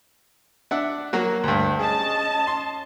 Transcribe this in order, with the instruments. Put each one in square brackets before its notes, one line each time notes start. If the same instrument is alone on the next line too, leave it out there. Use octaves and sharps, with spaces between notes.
[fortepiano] D4 E5 F#5
F#3 A#3 F#4
D2 G2
[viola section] C#4 D#5 A5 [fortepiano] G#4
[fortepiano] C6